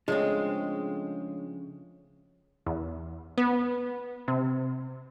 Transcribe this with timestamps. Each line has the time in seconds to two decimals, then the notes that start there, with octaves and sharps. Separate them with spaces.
0.08 C#3 F3 G#3 A3 C4 D4 C#5
2.66 E2
3.38 B3
4.28 C3